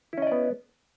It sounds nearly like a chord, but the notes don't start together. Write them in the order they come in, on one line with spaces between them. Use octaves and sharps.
E4 C#4 D#5 D5 B3